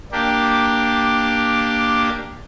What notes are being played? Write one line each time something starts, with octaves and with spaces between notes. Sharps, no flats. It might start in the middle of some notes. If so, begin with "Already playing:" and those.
A#3 D4 G4